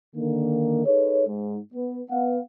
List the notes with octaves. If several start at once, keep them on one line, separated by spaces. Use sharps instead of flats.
D3 D#3 A#3
D#4 G#4 A4 B4 C#5
G#2
B3
B3 F5 F#5